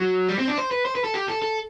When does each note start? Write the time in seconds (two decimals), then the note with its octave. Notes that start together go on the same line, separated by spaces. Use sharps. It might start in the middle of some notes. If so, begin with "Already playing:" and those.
Already playing: F#3
0.29 G3
0.39 C4
0.48 D4
0.58 C5
0.71 B4
0.85 C5
0.95 B4
1.04 A4
1.14 G4
1.28 A4
1.42 A4